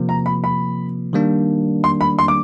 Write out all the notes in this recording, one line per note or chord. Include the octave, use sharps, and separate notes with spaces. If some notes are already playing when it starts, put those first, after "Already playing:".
Already playing: C3 F3 A#3
A#5
B5
B5
D#3 G3 A#3 D4
C6
B5
C6
D6